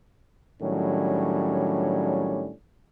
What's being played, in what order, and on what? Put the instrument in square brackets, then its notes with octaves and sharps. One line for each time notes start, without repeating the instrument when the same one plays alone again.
[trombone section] A2 D#3 F#3 G3 C#4 D4